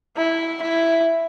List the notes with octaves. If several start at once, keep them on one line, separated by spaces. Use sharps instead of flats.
E4
E4